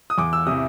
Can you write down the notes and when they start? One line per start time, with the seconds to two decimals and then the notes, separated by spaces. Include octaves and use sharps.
0.10 D#6
0.18 E2 D6
0.33 E6
0.47 C3 E3 D#6